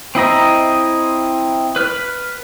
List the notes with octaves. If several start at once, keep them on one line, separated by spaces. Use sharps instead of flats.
C4 E4 D#5 A#5
B4 F6